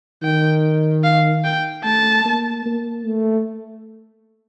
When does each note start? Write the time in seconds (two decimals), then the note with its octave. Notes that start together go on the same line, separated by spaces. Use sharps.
0.23 D#3 G5
1.04 F5
1.44 G5
1.85 A3 A5
2.25 A#3
2.66 A#3
3.06 A3